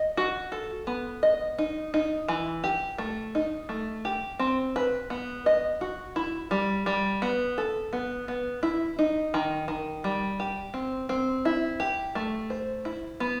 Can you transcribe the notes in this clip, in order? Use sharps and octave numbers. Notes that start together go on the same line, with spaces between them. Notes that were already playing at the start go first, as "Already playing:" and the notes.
Already playing: D#5
F#4
A4
B3
D#5
D#4
D#4
E3
G4
A3
D#4
A3
G4
C4
B4
B3
D#5
F#4
E4
G3
G3
B3
A4
B3
B3
E4
D#4
D#3
D#3
G3
G4
C4
C4
E4
G4
A3
C5
E4
B3